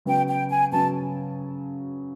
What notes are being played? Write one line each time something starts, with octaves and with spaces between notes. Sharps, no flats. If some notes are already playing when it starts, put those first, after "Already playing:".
C#3 F#3 B3 G5
G5
G#5
C#3 F#3 B3 A5